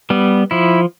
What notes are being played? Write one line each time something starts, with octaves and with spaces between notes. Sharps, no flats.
G3 B3
F3 E4